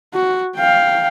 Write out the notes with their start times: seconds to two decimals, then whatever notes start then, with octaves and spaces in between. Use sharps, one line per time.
0.14 F#4
0.56 F5 G5